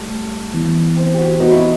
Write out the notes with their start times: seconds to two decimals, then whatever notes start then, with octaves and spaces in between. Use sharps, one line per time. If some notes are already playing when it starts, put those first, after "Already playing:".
Already playing: G3 A3
0.54 E3 B3 E4
0.97 C4
1.14 G4
1.18 F#4
1.40 B3 D#4 F#4 B4
1.52 E4